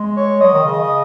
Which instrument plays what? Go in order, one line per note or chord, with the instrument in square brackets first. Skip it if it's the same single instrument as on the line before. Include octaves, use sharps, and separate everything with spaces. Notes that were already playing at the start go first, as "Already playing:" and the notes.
Already playing: [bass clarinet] G#3
[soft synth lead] C#5
[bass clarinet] F#3 [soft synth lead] D#5
[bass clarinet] D#3
[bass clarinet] C#3 [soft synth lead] D#5
[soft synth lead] D#5